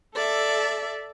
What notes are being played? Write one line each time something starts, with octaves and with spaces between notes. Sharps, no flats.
A4 D5 E5